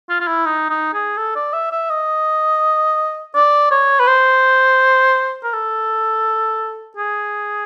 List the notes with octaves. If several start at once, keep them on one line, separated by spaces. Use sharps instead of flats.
F4
F4
E4
D#4
D#4
G#4
A4
D5
E5
E5
D#5
D5
C#5
B4
C5
A#4
A4
G#4